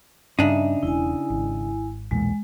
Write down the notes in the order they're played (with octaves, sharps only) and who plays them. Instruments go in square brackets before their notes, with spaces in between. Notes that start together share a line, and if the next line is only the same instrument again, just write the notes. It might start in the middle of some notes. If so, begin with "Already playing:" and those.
[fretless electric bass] G2 [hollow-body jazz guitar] C#3 D4 D#4 [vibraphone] E5
[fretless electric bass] E1 [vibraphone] E4 G#5
[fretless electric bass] G#1
[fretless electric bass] B1 E2 A#2 [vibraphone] G#3